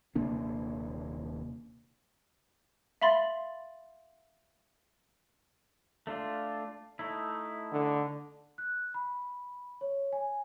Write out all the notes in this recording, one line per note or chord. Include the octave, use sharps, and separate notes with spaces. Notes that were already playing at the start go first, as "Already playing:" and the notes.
D#1 C3 A#3 D4
E5 F5 B5 C6 A6
A3 D4 F4
A3 D#4 E4
D3
F#6
B5
C#5
G#5